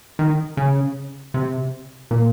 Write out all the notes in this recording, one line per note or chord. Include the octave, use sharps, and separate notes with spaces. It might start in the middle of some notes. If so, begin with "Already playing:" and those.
D#3
C#3
C3
A#2